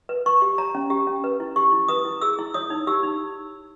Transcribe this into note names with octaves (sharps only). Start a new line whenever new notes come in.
B4
B4 C#6
G4
C#5 A#5
C#4
G4
C#4
B4
E4
G4 C#6
E4
B4 D#6
E4
G#4 E6
E4
C#5 D#6
D#4
G4 E6
D#4